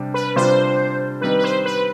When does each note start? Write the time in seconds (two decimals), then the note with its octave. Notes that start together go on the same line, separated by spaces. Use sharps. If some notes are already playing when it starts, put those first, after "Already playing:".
Already playing: C3 G3 D4
0.14 B4
0.35 C3 G3 D4 F4 C5
1.21 D#3 G3 C4 D#4 B4
1.39 B4
1.44 C5
1.66 B4